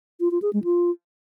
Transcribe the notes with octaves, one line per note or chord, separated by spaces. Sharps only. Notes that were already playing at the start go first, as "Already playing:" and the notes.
F4
F4
G#4
G#3
F4